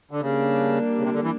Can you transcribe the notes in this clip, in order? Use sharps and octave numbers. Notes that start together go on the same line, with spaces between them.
D3
C#3 G3 A#3 D4
C#3
C3
D3
E3